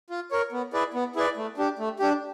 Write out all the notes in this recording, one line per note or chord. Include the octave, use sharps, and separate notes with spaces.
F4
A#4 C#5
B3
E4 G#4 B4 D5
B3
E4 G#4 B4 D5
A3
D4 G4
A3
D4 G4